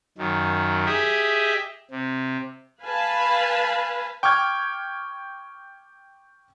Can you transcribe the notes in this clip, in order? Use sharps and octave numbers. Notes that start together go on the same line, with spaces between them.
F#2 D#3
G4 G#4 D#5 E5
C3
B4 F5 G#5 A5 B5
G5 C#6 D6 F6 G#6